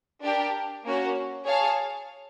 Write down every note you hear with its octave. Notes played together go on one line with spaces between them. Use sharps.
D4 G4 A#4
A#3 C#4 F#4
G#4 C#5 F5 A5